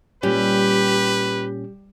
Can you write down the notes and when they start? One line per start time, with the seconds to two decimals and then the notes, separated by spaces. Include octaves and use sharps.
0.23 A#2 G3 C#4 G4 B4